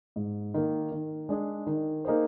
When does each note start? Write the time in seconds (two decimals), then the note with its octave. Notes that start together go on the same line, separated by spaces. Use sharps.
0.16 G#2
0.54 D#3 A#3
0.92 D#3
1.29 G#3 D4 G#4
1.67 D#3
2.05 A#3 D#4 G#4 C5